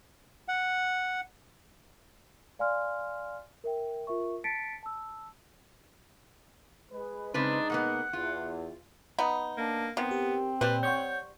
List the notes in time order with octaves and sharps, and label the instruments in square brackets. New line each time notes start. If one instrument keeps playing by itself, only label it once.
[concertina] F#5
[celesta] D5 F5 G#5 C6 F6
A#4 E5 G5
F4 A#4 E5 C#6
A5 A6 B6 C#7 D7
A5 E6
[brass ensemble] G#3 B4
[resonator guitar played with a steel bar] C#3 C4 B4 [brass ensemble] G#3 D#4 [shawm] D4
[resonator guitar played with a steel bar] B2 A#3 B3 [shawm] F#5
[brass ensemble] E2 [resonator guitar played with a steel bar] F4
[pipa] B3 D#4
[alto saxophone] A#3 [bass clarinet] D4
[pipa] D#3 [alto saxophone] B3 [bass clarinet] C4
[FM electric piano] G4
[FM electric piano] A#2 [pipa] G3 C5 [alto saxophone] B4
[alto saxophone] C#5 [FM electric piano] F#5 C#6 G6